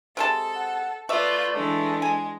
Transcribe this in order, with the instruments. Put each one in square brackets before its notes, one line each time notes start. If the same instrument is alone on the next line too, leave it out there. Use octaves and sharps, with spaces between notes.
[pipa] C3 G#3 A5 [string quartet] A4
[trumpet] F#5
[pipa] A3 E5 [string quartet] F4 B4 F#6 [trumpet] D5
[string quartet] E3 G#3 D4 [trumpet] A4
[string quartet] G#3 [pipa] G#5